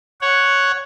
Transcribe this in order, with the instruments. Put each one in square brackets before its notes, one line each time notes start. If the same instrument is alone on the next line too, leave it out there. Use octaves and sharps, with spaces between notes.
[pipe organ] C#5 F#5